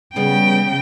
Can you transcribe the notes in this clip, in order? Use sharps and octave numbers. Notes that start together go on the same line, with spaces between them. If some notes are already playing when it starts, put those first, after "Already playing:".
C#3 G3 B3 G#4 G5